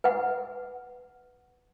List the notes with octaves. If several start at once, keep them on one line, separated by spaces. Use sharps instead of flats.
B4 F#5